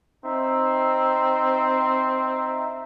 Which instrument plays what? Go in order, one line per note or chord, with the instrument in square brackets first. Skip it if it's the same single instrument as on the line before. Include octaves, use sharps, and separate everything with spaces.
[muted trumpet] C4 [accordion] D#4 E5